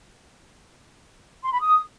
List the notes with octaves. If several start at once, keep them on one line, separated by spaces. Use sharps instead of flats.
C6
B5
D#6